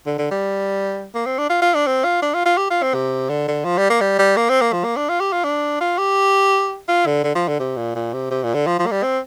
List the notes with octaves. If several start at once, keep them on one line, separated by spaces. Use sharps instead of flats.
D3
D3
G3
A#3
C4
D4
F4
F4
D4
C4
F4
D4
F4
F4
G4
F4
C4
C3
D3
D3
F3
G3
A#3
G3
G3
A#3
C4
A#3
F3
A#3
D4
F4
G4
F4
D4
F4
G4
F4
D3
D3
F3
D3
C3
A#2
A#2
C3
C3
A#2
D3
F3
F3
A#3
G3
C4